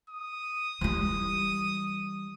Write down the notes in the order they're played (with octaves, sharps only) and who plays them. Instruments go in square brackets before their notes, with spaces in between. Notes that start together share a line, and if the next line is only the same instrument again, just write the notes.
[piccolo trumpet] D#6
[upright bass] E3 G3